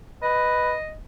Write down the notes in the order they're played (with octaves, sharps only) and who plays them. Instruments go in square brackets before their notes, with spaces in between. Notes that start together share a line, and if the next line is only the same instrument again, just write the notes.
[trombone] B4 [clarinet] D#5